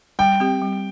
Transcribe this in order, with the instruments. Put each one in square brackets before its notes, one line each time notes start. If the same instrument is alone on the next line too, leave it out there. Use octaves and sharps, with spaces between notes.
[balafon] G3 [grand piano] G5
[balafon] C4 G4
G3